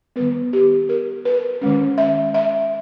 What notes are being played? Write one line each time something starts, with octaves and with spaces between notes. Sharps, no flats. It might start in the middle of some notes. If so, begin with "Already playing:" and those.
D#3 G3 B3 B4
G4
A#4
B4
D#3 G#3 C#4
E5
E5